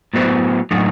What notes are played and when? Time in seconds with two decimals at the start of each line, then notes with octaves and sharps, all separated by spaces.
0.14 A2 F#3 B3 F#4 C5
0.71 A2 F#3 A3 D#4